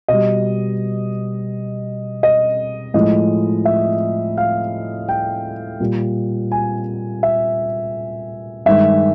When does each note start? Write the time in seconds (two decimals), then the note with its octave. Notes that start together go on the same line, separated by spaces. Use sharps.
0.08 B2 G3 D#5
2.23 D#5
2.94 A2 F3 G#3 D#5
3.65 E5
4.38 F5
5.09 G5
5.80 A#2 G3
6.52 G#5
7.23 E5
8.66 G2 D#3 G#3 E5